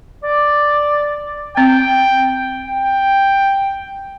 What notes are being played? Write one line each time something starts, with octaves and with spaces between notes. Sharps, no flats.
D5
C4 G5
G5